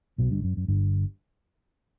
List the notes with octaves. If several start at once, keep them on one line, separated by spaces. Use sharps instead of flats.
B1 B2
G1 G2
F#2
F#2
G1 G2